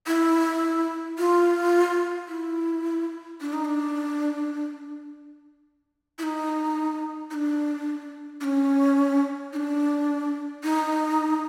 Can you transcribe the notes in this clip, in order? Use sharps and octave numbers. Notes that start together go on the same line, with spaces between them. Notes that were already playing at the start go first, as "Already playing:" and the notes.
E4
F4
E4
D4
D#4
D4
E4
D#4
D#4
D4
D4
C#4
D#4
D4
D#4